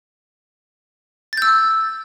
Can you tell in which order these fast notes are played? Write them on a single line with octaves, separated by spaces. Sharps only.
A6 G6 E6